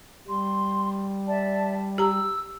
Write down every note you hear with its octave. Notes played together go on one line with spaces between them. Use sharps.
G3 C6
D5 E5 A5
G4 A#5 E6